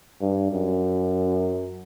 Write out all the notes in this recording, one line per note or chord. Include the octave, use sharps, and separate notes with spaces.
G2
F#2